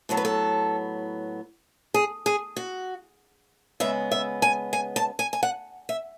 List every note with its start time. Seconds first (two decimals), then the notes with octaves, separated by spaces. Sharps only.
0.09 A2 F#3 B3 A4
0.17 B4
0.25 A4
1.94 G#4
2.26 G#4
2.56 F#4
3.80 C#3 G#3 B3 E5
4.12 E5
4.42 G#5
4.73 G#5
4.96 A5
5.19 G#5
5.33 G#5
5.43 F#5
5.89 E5